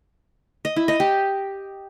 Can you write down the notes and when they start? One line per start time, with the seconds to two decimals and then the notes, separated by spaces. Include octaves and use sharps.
0.65 D#5
0.76 E4
0.88 D#5
1.00 G4